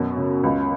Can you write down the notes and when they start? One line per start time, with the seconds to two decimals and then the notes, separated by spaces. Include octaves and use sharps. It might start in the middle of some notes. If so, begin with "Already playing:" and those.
Already playing: F#2 B2
0.17 C#3
0.43 C#2